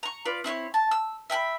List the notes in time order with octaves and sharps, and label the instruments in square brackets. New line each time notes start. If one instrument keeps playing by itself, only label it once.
[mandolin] A#5 C#6
F4 B4 D5
C4 E4 C5 C#5
A5
E6
E5 G5 G#5 B5